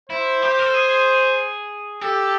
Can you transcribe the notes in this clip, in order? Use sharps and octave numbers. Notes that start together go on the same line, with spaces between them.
E4 C5
G4
A#4
A4
G#4
G4 A4